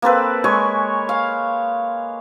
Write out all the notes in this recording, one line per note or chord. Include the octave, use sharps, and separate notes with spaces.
A#3 C4 A4 B4
G#3 C#5 G#5 C#6
F5